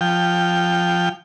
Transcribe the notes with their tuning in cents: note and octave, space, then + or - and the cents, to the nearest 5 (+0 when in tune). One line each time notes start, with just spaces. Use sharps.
F3 +0 G5 +0